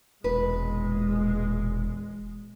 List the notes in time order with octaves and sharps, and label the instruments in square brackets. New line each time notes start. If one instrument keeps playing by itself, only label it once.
[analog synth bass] E1 [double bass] A#2 G#3 [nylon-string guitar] B4